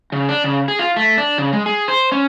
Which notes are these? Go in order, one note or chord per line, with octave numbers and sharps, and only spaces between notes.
C#3
D4
C#3
G#4
F4
A3
D4
C#3
G#3
G#4
C5
C#4